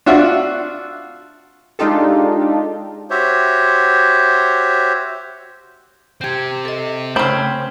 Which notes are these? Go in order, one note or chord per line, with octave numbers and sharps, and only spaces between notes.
D4 F4 F#4 E5
G#3 D4 D#4 F4 G4 A4
F#4 G4 C5 C#5 E5
C4 G4 G6 G#6
A4 D#5
C#3 A3 C4 C#4 C5 B5 C6